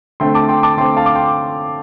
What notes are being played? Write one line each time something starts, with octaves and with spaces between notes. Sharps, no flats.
D3 A3 C4 G5 C6
A5 D6
G5 C6
A5 D6
D3 A3 C4 G5 C6
F5 A5
D6
G5 C6